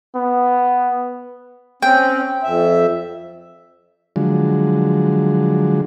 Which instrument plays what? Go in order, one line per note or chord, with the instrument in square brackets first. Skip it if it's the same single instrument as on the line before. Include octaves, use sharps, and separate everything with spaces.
[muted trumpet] B3
[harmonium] C4 C#4 [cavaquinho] G5
[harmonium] F2 E5
[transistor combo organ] D3 F3 F#3 G#3